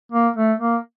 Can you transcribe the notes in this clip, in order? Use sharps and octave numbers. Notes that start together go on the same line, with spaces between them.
A#3
A3
A#3